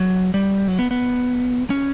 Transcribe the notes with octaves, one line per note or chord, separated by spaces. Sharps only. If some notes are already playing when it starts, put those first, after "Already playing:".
Already playing: F#3
G3
F#3
B3
B3
C#4